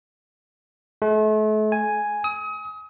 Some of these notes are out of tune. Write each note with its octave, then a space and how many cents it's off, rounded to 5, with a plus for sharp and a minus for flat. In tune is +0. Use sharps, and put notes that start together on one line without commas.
A3 -40
G#5 +0
D#6 +35